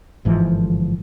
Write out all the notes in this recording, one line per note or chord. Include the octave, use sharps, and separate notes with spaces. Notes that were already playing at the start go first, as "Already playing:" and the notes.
G1 G#2 E3 F3